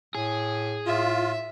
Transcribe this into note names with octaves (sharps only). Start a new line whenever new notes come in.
A2 G#4
A2 F4 E5